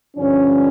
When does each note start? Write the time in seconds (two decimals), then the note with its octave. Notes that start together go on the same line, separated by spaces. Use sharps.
0.17 G2 D3 F3 C#4